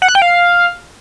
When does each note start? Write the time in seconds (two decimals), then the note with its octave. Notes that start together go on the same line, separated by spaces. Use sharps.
0.02 F#5
0.08 F#6
0.15 G5
0.22 F5